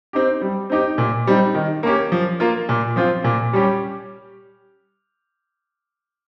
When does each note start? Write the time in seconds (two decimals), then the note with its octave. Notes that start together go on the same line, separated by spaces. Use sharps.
0.13 C4 D#4 G4
0.42 G3
0.70 C4 D#4 G4
0.98 A#2
1.27 G3 C4 D#4
1.55 D#3
1.83 A#3 C#4 G4
2.12 F3
2.40 A#3 F4
2.69 A#2
2.96 F3 C4 F4
3.24 A#2
3.53 G3 C#4 G4